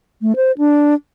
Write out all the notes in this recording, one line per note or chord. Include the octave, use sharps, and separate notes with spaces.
A3
C5
D4